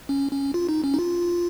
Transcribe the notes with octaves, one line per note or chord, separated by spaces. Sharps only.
C#4
C#4
F4
D#4
C#4
D#4
F4